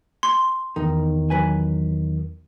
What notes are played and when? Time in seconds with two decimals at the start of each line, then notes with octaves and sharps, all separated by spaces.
0.23 C6
0.76 E2 D#3 D#4
1.30 F#3 B4 G#5